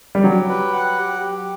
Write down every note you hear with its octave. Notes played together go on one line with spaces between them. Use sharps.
G3
F#3 G4
B4
F#5
G4
G4